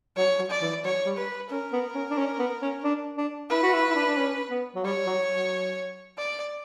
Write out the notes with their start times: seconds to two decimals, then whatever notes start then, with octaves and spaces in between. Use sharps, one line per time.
0.17 F#3 C#5
0.39 F#3
0.50 D5
0.61 E3
0.84 F#3 C#5
1.06 G3
1.17 B4
1.50 C#4 A#4
1.73 B3
1.95 C#4
2.10 D4
2.18 C#4
2.39 B3
2.62 C#4
2.84 D4
3.17 D4
3.50 E4 B4
3.63 F#4
3.74 E4
3.90 E4
3.95 D4
4.06 D4
4.17 C#4
4.50 B3
4.75 F#3
4.84 G3 C#5
5.07 F#3
5.29 F#3
6.18 D5